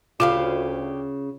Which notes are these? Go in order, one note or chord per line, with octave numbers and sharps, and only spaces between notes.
D2 C#3 F4 G4 F5 B5